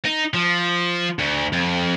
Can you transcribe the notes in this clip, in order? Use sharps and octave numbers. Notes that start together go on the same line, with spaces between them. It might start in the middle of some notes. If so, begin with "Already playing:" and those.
D#4
F3
D2
F2